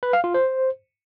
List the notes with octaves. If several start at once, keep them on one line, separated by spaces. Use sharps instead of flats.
B4
F5
F4
C5